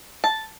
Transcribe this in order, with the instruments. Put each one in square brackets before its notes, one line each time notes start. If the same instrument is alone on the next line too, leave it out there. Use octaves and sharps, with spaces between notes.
[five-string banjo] A5